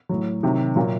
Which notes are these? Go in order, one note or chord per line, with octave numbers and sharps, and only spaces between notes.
A2 F#3
C3 D#3 F#3
A#2 F#3 A#3